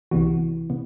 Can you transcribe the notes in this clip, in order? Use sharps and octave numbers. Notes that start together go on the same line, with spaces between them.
C2 C3 E3 G3 B3 F#4
C3 B3